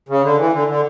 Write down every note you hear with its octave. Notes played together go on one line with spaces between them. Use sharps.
C#3
D3
E3
D3
D3